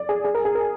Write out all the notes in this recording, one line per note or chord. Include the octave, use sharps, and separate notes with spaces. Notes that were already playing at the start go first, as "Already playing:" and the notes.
Already playing: D5
G#4
G#4
A#4
G#4
A#4